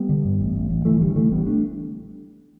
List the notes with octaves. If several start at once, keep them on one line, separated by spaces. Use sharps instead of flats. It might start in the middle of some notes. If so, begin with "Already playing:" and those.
Already playing: G3 B3
D3
G2
A1
A1
A1
D3 E3 A3
A1 D3 G3
D3 E3 A3
A1 G3 B3
A3 D4